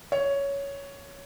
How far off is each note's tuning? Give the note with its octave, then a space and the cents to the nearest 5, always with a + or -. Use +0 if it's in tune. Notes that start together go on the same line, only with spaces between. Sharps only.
C#5 +10